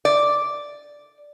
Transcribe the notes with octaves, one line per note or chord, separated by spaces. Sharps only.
D5